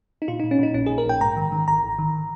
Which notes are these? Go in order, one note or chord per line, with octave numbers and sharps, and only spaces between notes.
D#4
A#2 F4
A#2 D#4
C#4
A#2 D#4
A#1 C#4
A#2 G#4
A#4
A#1 G5
G#2 A#5
D#3
D#3
G#1 A#5
G#1
D#3